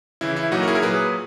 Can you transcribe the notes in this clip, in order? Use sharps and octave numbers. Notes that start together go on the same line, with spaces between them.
C#3 E3 E4
E4
A#2 F#3 D#4 F#4
A#4
E4 G#4
A#4
A#2 F#3 G#4 B4